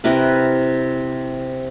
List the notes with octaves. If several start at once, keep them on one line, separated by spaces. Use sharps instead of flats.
C3 E4 A#4 B4